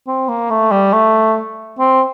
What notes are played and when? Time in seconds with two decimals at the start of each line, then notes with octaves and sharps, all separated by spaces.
0.07 C4
0.29 A#3
0.50 A3
0.71 G3
0.93 A3
1.79 C4